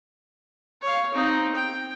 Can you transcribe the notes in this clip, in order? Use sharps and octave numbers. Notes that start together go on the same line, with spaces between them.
C#5 F5
C4 D#4
G5